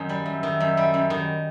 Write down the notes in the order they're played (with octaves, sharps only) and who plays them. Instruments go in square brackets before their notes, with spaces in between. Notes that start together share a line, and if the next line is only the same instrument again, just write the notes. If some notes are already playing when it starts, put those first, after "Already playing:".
Already playing: [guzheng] F#2 D#3
G3
[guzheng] F#2 [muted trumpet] E5
[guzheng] D#3
F#2
G3
F#2
D#3